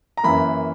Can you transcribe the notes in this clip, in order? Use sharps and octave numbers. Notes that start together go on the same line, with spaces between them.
A#5
F#2 E3 A#3 B5